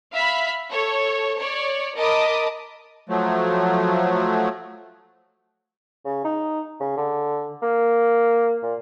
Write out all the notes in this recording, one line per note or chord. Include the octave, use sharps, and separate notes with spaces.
E5 F5 B5 B6
A4 C#5
C#5 D5
A#4 D#5 A5 B5 D6 D#6
F3 F#3 A3
C#3
D#4
C#3
D3
A#3
A#2